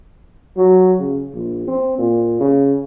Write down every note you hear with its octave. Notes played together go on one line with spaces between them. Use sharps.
F#3
C#3
A#1
C4
A#2
C#3